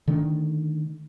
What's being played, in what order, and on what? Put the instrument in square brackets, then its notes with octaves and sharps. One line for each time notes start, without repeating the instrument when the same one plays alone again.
[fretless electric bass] D3 D#3 A3 D4